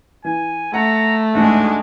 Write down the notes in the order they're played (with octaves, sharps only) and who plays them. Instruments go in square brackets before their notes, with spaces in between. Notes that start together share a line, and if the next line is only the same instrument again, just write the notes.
[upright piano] E3 [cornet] G#5
[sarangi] A3 [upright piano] F#5 [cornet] A#5
[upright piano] A1 D2 G#2 [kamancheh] G#3 D4 [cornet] F#4